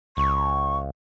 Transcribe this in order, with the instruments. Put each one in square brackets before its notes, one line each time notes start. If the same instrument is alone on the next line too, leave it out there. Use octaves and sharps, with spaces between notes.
[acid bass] C#2 [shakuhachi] C#6